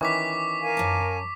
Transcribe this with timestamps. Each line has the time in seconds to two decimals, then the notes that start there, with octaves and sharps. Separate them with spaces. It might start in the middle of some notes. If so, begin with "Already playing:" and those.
0.01 D#3 E3 C#4 C#6 D6 B6
0.61 A#4 F5 G#5
0.77 F#2 A5